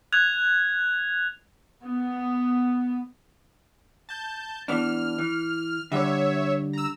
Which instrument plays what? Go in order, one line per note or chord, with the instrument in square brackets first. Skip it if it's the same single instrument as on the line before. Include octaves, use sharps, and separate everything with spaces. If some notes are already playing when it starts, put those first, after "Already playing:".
[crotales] F#6 G#6 F7
[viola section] B3
[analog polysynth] A5 G6
[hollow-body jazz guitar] E3 B3 D4 [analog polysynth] F6
[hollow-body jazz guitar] E3
[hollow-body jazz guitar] D3 G3 [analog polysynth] C#5 E5
[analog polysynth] A#5 E6